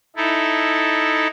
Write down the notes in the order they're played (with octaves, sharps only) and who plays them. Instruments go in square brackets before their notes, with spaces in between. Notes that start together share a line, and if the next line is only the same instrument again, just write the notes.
[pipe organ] D#4 E4 A4